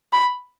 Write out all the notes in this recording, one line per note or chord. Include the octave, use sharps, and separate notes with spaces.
B5